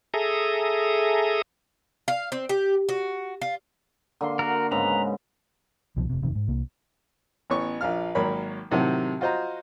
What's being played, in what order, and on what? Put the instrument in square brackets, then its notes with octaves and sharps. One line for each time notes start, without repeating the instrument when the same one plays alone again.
[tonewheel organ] G#4 A4 E5 A#5 D#6
[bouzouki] F5
C4
G4
F#4
F4
[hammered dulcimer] D3 A#3 C6
[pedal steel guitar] F#4 A#4
[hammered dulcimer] G#2 C#3 B3 [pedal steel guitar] B4 A#5
[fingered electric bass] C2 B2 F3
F1 C3
E1 F2 C3 D#3
G#2
C2 A#3
[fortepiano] A1 B3 C#5 C#6
A#1 F3 F5 F6
G#1 F#3 A#3 A#4 C#5 B5
A2 C3 D#3 F#3 C4 F#5
F4 F#4 C5 D#5 A#5